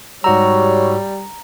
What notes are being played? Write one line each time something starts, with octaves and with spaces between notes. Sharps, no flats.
G#2 G3 F#4 C#5 A#5 E6